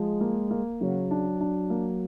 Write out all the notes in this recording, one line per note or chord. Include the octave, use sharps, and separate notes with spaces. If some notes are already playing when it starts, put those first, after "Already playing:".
Already playing: F3 G#3
A#3
A#3
C#3 F#3
D4
D4
A#3